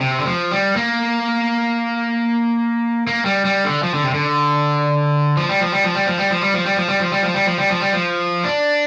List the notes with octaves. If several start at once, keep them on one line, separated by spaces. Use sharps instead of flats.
C3
D3
F3
G3
A#3
A#3
G3
G3
D3
F3
D3
C3
D3
F3
G3
F3
G3
F3
G3
F3
G3
F3
G3
F3
G3
F3
G3
F3
G3
F3
G3
F3
G3
F3
G3
F3
D4